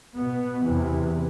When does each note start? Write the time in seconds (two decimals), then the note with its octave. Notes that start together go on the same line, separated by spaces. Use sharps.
0.17 B2 B3
0.64 E2 C3 E3